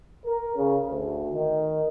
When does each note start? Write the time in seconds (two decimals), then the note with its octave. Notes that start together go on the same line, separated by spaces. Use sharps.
0.24 A#4
0.56 C#3
0.88 D2
1.33 D#3